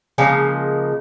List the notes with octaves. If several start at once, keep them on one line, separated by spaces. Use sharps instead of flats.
C#3 F3 G#3 A#3